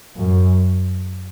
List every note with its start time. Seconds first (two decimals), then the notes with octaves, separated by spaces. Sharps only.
0.17 F#2